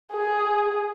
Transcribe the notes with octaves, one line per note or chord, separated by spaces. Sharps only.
G#4